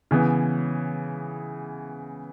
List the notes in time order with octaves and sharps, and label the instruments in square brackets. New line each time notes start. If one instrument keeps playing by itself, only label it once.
[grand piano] C#3 E3 B3